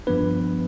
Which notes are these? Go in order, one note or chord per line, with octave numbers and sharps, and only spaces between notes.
G2 F3 B3 D4 B4